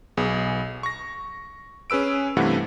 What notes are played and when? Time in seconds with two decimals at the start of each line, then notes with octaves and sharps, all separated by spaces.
0.17 B1 B3 G#4
0.83 C#6 A#6
1.90 C#4 G#4 B4 E6 D7
2.37 G2 C3 E3 A3 F#5